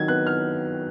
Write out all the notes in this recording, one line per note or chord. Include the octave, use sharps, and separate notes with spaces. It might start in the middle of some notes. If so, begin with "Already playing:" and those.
Already playing: D#3 F#3 D#5 G#6
B3 F#6
F6